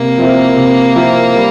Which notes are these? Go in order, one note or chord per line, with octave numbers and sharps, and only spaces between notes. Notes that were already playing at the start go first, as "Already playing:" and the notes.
Already playing: C3 A#3
F3 C4 E4 A#4
C3
F3 C4 E4 A#4
G3